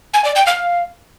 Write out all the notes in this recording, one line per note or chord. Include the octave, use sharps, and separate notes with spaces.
G#5
D5
G5
F5